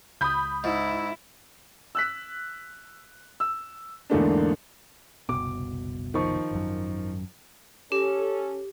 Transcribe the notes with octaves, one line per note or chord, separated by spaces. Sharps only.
C#2 B5 D#6 G6
G#2 E4
E6 F#6 B6
E6
E2 G#2 D3 A3 A#3 D4
F#1 C2 B2 D6
D#3 F3 C#6
G#1 F#2
C#4 G4 A4